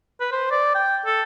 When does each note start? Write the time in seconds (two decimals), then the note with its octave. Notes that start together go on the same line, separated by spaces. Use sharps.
0.20 B4
0.32 C5
0.51 D5
0.75 G5
1.06 A4